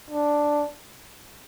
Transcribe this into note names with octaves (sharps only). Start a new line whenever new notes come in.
D4